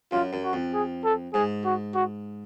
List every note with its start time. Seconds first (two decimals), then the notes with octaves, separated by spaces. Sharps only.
0.12 F#2 F4
0.33 F#2
0.44 F#4
0.53 F2
0.74 G#4
1.04 A4
1.34 G#2 G#4
1.65 F#4
1.95 F#4